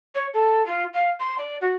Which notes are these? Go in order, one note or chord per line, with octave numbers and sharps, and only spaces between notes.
C#5
A4
F4
F5
C6
D5
F#4